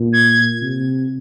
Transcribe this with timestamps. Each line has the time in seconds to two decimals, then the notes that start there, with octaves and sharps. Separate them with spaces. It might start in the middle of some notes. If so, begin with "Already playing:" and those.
Already playing: A#2
0.12 G#6
0.62 C3